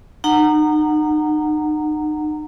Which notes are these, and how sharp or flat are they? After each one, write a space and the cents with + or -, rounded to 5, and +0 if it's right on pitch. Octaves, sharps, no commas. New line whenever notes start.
D#4 -35 F#5 +0 A#5 -15